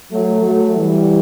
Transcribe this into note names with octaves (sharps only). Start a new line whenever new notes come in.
F#3 A3
F#3 A3
E3 G3